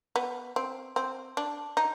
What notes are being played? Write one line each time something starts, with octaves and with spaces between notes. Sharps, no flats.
B3
C4
C4
D4
D#4